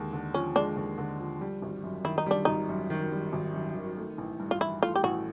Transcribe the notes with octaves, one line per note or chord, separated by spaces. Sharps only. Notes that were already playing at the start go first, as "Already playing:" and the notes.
Already playing: D#2 D3 G#3
D3
F3 C#4
G#3 D4
D#2
D3
F3
G3
G#1
F#2
D#3 E4
D#4
G3 D4
G#1 D#4
F#2
D#3
G3
G#1
F#2
D#3
A3
A1
G2
F4
E3 E4
A3 F4
G4
A1 F#4